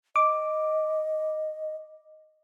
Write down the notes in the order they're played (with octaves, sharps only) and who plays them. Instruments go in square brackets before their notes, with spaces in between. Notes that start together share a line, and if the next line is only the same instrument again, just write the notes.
[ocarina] D#5 [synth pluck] D6